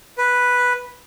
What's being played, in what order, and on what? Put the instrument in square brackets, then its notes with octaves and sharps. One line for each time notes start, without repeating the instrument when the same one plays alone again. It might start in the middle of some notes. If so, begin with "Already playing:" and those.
[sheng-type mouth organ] B4